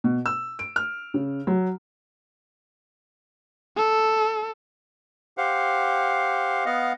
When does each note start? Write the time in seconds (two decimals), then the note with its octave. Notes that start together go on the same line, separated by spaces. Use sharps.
0.04 B2
0.26 E6
0.59 D7
0.76 F6
1.14 C#3
1.47 F#3
3.77 A4
5.38 G4 C5 F5 F#5
6.66 B3 D#5 F5 F#5